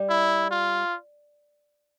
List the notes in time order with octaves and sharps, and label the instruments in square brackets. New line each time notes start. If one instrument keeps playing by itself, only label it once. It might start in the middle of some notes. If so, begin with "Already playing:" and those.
Already playing: [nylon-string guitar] G3
[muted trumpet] E4
F4